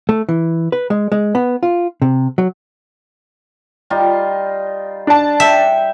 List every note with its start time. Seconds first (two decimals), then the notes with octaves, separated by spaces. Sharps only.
0.09 A3
0.29 E3
0.72 B4
0.90 G#3
1.12 G#3
1.35 B3
1.63 F4
2.02 C3
2.38 F#3
3.90 G3 D#4 F4
5.07 D4 A5
5.40 E5 G5